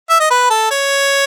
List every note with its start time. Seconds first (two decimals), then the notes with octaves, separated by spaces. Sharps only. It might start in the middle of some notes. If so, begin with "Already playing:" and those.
0.10 E5
0.20 D#5
0.30 B4
0.50 A4
0.71 C#5